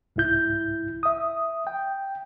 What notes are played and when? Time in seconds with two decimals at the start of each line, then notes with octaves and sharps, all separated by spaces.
0.16 C2 G#2 E4 G6
1.03 E5 D#6
1.67 G5